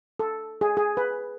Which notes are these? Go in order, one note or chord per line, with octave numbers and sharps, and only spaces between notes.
A4
G#4
G#4
B4